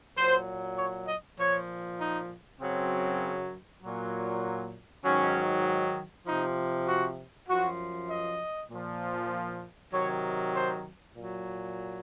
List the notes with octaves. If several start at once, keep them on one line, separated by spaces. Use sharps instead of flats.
A#2 F#3 C5
C#5
D#5
A#2 F3 C#5
D#4
F#2 C#3 F#3 C4
A#2 F#3
G#2 D#3 F#3 C#4
C3 F3 D#4
F#4
F#2 F3 F#4
D#5
A#2 F3
C3 D#3 F#3 C#5
C5
A#2 F#3